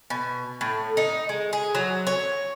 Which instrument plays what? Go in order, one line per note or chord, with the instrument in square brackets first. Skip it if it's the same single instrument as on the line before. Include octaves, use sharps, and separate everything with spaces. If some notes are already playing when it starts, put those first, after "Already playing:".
[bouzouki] B2
A2
D#4
G#3
G#4
F#3
C#5